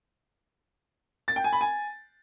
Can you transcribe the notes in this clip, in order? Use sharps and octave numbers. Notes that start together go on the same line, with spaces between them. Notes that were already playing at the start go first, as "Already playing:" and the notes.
A6
G5
G#5
B5
G#5